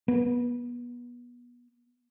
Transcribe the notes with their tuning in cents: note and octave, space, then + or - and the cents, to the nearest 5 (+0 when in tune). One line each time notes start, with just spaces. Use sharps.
B3 -25